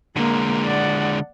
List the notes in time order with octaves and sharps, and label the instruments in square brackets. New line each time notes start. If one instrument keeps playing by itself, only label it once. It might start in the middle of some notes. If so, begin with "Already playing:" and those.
[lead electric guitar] D3 G#3 [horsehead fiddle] A#3
[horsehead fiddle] D5 F#5